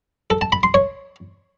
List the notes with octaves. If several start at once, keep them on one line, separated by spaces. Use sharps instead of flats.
A4
A5
B5
C6
C#5